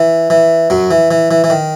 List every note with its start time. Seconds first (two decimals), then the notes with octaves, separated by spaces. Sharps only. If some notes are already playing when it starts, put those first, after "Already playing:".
Already playing: E3
0.30 E3
0.70 F#2 F#3
0.91 E3
1.11 E3
1.31 E3
1.44 E3
1.50 D#3